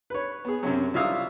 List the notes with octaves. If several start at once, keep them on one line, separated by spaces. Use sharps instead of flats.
B4 C#5
B3 G#4
F#2 C3 F#3
C2 F4 E5 F5 D#6 E6